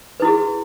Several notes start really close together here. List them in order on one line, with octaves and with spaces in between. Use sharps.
B4 E4 F#4 G#4